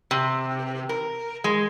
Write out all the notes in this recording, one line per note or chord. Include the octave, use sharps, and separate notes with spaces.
C3
A#4
G#3